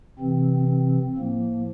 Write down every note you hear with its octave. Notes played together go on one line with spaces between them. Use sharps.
C3 E3 C4
C4
A2 F3 A#3